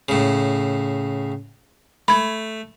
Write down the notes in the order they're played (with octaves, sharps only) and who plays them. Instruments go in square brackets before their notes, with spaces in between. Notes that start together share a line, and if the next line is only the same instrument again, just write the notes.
[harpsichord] A2 C#3
[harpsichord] A3 [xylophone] B5 G#6